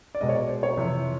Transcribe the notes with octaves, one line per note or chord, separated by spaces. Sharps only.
D5
B2 G#3 D#5
C#5
D5
C5
C#5
F2 C3 E3